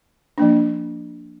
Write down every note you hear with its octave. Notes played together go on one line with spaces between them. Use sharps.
F3 A#3 D4